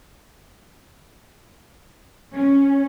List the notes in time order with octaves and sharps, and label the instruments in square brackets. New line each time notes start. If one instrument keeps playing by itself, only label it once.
[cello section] C#4